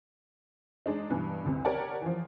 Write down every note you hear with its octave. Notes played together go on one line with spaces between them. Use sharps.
G#3 D4 D#4
G2 B2 E3
A1 D2 C3
G4 A#4 C#5 D5 F#5 A5
E3 F3